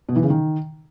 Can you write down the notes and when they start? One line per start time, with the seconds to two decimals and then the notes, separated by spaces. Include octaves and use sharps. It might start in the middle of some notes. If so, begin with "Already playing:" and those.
0.09 B2
0.16 E3
0.23 C#3
0.30 D#3